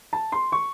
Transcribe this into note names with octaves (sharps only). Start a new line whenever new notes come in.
A5
C6
C#6